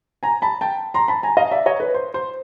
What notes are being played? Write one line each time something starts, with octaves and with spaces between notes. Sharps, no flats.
G#5 A#5
A5 B5
G5 A5
A#5 C6
A5 B5
G#5 A#5
D#5 F5
D5 E5
C#5 D#5
B4
C5
C5